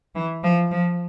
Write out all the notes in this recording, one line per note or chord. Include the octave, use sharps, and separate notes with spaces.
E3
F3
F3